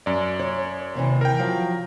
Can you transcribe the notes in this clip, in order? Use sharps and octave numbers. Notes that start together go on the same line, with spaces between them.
F#2 D5
C#5
D#2 C3 E3
A#4 G5
F3 F#3